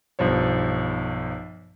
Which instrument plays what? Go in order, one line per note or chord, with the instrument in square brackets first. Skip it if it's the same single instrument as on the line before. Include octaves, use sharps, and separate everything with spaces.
[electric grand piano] B1 G2 F3 C5 C#5